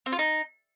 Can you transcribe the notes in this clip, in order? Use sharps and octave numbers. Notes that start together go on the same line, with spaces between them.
C4
F4
D#4